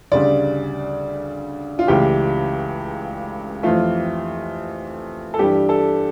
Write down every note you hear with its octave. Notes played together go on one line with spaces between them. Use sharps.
D2 C#3 G3 D5
F4
C#2 C#3 E3 A3 G4
F2 E3 A3 F4
A4
G2 E3 G3 G4
A4